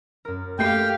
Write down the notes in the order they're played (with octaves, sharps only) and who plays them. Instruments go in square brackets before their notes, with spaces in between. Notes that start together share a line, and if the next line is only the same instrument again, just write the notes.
[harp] F#2 A#4
[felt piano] A3 C7 [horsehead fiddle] G4 F5 [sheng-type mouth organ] G5